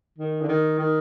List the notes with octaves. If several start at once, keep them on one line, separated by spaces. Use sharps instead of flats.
D#3
D3
D#3
D#3